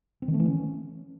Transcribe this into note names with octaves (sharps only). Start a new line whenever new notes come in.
C4
D#3
A3
E3
C#4